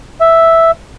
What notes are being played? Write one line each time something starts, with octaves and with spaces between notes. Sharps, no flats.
E5